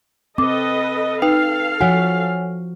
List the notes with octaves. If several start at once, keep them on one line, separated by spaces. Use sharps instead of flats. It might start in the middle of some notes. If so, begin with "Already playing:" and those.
C4 A4 B4 D#5 D6
D#4 A4 B4 F5 G5
F3 F#4 C#5 F#5 G#5